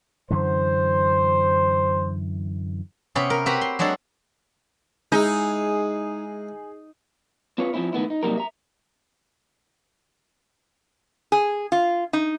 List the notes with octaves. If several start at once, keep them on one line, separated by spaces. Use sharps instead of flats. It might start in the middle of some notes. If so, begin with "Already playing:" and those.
F#2 D3 E3 C5
C3 B3 C#4
A#4
C4 F#4 G4 B4 A#5
C6
F#3 G#3 D4 F#4 A4
G#3 D#4 E4 G#4
C4 F4 B4 C#5
F3 G3 C4 C#4 E4
D#3 A3 B3 E4
D#4
C3 F#3 G3 A#3 D#4 A#4
E5 A#5
G#4
F4
D#4